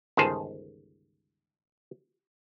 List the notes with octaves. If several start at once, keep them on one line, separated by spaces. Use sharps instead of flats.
G1 C#2 D#3 G#4 C5 A5